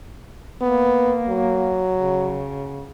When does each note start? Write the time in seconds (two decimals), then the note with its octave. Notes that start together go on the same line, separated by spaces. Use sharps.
0.61 A#3 B3
1.29 F#3
1.95 C#3